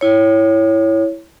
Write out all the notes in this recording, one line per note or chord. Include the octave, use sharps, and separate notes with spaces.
E4 C#5